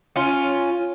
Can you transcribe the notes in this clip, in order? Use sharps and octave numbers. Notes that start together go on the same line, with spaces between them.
C#4 F4